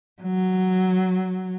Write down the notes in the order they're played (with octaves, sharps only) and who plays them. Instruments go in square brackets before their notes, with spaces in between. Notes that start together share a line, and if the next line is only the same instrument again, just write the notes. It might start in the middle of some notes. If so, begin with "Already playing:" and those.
[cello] F#3